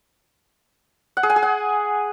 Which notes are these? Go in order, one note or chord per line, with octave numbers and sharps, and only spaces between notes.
F#5
G#4
G#5
G#4
F#5